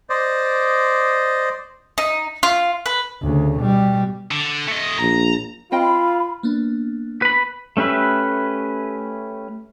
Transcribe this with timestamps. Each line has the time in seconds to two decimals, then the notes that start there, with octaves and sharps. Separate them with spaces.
0.10 C5 D5 D#5
1.98 D#4
2.43 F4
2.86 B4
3.22 D2 C#3
3.60 B2 G3
4.31 D3
4.68 A3 D#5
4.99 A#1 A#5
5.72 C4 F4 D#5 G5 B5
6.43 A#3 B3 D4
7.22 B4 B5
7.77 A3 C#4 G4 B4 E5